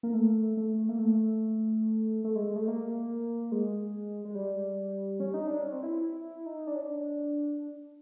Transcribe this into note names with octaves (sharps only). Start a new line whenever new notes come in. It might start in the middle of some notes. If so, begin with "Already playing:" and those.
A#3
A3
A3
A#3
A3
A3
G#3
G#3
A3
A#3
G#3
G#3
G3
C#4
D#4
D4
C#4
C4
E4
E4
D#4
D4
C#4
D4